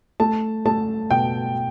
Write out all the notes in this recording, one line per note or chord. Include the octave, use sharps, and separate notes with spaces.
A3 A5
A3 A5
B2 G5